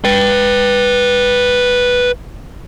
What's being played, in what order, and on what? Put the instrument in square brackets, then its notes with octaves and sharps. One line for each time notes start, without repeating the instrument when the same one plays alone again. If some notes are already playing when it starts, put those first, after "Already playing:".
[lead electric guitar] B4 G5